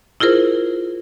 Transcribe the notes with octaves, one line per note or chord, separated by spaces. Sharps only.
E4 F4 G#4 A#4 C5